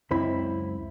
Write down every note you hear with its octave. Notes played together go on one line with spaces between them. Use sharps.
C#2 F#2 C4 E4 B5